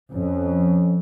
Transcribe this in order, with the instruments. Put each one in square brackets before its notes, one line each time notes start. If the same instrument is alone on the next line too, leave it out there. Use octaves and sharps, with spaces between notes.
[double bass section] F2 [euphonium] C#4